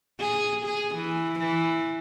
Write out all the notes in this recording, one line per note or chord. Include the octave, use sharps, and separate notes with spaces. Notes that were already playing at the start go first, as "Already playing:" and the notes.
G#4
G#4
E3
E3